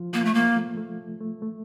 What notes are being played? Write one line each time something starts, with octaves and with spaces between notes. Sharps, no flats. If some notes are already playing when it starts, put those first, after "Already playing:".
Already playing: F3 F4
F3 A#3 F4
A3
A#3
A3
A3
A3
A3